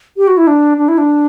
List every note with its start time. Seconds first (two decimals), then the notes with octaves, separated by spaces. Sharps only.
0.17 G4
0.28 F#4
0.37 E4
0.47 D4
0.78 D4
0.88 E4
0.98 D4